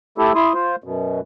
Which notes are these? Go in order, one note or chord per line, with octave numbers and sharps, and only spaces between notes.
A3 E4 G4 A4
E4 C6 D#6
F4 C5
F#2 B2